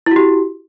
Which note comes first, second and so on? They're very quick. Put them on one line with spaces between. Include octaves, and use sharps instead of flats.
E4 F#4 G4